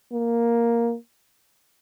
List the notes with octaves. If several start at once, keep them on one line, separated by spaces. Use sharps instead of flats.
A#3